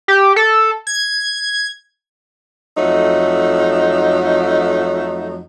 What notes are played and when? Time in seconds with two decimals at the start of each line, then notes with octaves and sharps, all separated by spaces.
0.08 G4
0.36 A4
0.87 G#6
2.77 F2 F#3 A3 D#4